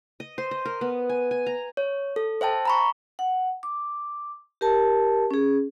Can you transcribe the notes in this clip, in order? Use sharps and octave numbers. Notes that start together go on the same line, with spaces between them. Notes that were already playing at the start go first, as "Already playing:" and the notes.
D#5
C5
D#5
A#4
B3
G#5
G#5
A#5
C#5
A4
C5 E5 G5 A5
A#5 B5 C#6
F#5
D6
G4 A#4 A5
C#4 G#4